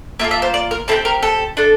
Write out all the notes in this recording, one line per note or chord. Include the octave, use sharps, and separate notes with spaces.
A#3 F4 A4 E5
E5
C5
D5
A#4
C4 E4 G4 A4
A#4
A4
D4 A4